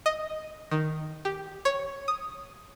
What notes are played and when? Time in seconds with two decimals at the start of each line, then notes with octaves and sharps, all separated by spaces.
0.06 D#5
0.71 D#3
1.25 G4
1.65 C#5
2.08 D#6